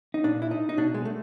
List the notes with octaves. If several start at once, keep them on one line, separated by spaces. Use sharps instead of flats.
D#4
A#2 D4
E4
D#4
D#4
B2 D4
G#3
A3